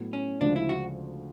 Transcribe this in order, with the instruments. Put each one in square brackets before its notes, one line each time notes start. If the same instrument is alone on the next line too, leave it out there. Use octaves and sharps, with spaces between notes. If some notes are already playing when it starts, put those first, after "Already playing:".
Already playing: [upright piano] A2 F#3 B3
[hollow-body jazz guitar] C#4
[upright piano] D2 C#3 F3 G#3 [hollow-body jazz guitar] D4
[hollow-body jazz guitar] E4
F#4